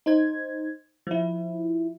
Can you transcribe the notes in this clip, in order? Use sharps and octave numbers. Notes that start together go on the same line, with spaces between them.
D#4 C5 G#6
F3 E4